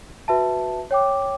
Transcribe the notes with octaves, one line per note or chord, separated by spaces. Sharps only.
F#4 B4 E5 A5
C#5 G5 D6